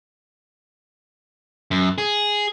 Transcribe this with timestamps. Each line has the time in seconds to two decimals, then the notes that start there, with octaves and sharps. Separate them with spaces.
1.71 F#2
1.98 G#4